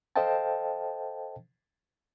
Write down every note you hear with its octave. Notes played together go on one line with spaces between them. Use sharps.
A4 C5 D#5 F5 G5 A5